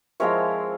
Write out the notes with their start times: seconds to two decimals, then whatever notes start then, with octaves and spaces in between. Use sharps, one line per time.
0.20 F3 G#3 C4 E4 A#4 C#5